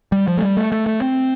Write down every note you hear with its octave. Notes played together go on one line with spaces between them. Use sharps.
G3
F3
A3
G3
A3
A3
A3
C4